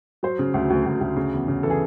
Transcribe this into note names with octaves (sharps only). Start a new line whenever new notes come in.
F#3 C5
C#3
D2
D2
D2
D2
C#3
E2
C#3
E3 A4
G#4